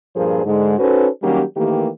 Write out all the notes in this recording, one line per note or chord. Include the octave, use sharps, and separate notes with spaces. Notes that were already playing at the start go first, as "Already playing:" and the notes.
G2 A#2 F3 G#4 A#4 C5
G#2 D3 G#3
C#4 D#4 F#4 A4 B4 C5
D#3 F#3 G3 A#3 C#4 G4
D#3 E3 A3 A#3 G4